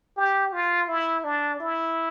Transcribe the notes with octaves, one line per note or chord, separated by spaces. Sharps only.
G4
F4
E4
D4
E4